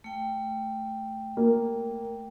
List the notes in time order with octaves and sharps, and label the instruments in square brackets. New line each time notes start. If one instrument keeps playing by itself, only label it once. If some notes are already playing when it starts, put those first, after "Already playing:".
[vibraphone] A3 G5
[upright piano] A#3